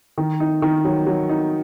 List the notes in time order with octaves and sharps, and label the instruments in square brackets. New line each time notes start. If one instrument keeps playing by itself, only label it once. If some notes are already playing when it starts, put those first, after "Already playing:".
[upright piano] D#3
D#4
D#3
F#3
F#3
D#4